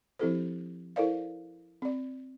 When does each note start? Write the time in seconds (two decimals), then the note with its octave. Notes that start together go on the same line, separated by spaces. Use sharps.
0.19 F3 C4 E4 G4 A4 C5
0.96 E4 A4 A#4 C5 D5 F5
1.82 C4 D5